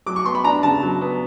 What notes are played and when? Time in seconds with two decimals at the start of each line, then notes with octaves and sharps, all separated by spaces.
0.06 F#3 D6
0.16 C#6
0.25 B3 C6
0.35 B5
0.44 D4 A#5
0.63 C#3 A5
0.82 F#3
1.01 B3